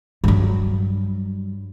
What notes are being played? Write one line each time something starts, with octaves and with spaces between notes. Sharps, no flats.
G2 F#3